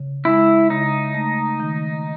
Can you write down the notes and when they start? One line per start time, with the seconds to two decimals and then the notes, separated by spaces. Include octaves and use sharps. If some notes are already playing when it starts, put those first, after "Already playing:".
Already playing: C#3
0.25 G#3 E4
0.70 C#3 D#4
1.15 A3
1.60 D#3